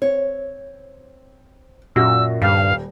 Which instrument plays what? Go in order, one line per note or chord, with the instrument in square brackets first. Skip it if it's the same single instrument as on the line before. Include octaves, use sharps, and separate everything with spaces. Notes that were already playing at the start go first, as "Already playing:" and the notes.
[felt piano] C4 [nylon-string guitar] C#5
[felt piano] F#2 F#4 A#6 [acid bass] A#2 [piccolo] E6
[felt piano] D#1 [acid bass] G2 [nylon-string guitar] G3 [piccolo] F5